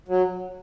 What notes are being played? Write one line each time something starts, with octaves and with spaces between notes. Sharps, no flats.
F#3